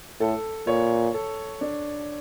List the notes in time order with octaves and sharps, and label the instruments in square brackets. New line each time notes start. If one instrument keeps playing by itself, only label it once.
[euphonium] A2 [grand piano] A4
[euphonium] A#2 [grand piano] C#5
[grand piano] A4
D4